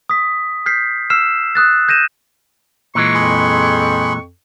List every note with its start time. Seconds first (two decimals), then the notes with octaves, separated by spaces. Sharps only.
0.09 D#6 B6
0.66 F6 G6 B6 C7
1.10 E6 F6 C7 E7
1.55 D#6 F#6 A6
1.88 G6 A#6 D#7 E7
2.95 A#2 E3 G#3 C#6
3.15 F2 G#4 B5 C6